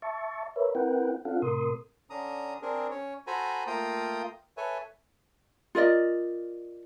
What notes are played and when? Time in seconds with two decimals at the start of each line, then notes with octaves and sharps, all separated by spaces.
0.02 E5 A5 C#6
0.56 A#4 B4 C#5 E5
0.75 C4 E4 A#4 B4 F#5 G5
1.25 C4 D4 F4 A4 F5 F#5
1.42 A2 C3 A#4 C6 D#6
2.10 D3 C#4 D4 A#5 D#6
2.62 C4 D4 G#4 A#4
2.90 C#4 C#5
3.27 F#4 A4 C5 G#5 A#5 B5
3.67 A3 A#3 F4 G5 A#5 D#6
4.57 A4 B4 C#5 E5 G#5
5.75 F4 A#4 D5 D#5